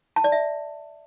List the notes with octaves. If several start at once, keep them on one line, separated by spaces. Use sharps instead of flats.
A5
D5
E5